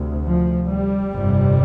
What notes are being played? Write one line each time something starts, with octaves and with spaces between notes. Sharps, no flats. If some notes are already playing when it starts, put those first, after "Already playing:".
Already playing: D2 C3
F3
G3
G1 F2 C3